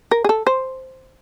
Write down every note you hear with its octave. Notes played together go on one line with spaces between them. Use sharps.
A#4
G#4
A4
C5